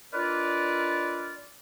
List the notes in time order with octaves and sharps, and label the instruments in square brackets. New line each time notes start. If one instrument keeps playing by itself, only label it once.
[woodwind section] D4 D#4 F4 A#4 B4 D5